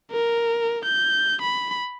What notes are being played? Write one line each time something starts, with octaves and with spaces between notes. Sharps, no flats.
A#4
G6
B5